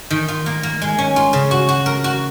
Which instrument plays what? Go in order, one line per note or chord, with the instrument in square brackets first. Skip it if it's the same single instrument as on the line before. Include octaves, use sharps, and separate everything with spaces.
[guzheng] D#3
F4
A#3
A#3
G#3
C#4
F4
C#3
F#4
F#4
A#4
F#4